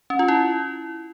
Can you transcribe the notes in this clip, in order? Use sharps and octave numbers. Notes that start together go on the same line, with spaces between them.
C#4
F4
E4